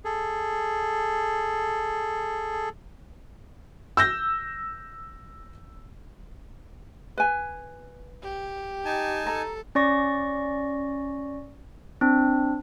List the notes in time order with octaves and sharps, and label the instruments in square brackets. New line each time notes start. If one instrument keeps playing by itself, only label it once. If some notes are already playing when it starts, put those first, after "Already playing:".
[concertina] G#4 A4
[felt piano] E6 G6 A#6
[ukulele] B4 G#5
[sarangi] G4
[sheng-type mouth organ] D#4 G#5 A5
[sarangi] A4 [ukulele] A#5
[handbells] C#4 D5 C#6 A#6
C4 D4